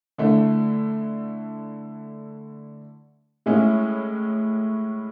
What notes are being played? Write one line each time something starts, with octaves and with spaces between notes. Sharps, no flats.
D3 A3 E4
A2 G#3 C#4 E4